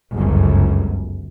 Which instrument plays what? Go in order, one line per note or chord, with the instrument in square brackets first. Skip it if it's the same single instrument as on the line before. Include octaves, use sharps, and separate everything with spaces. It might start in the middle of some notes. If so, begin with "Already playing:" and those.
[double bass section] G1 C#2 F#2